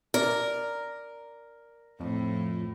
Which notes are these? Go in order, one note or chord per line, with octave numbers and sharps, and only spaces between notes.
A#4 D5
F2 A2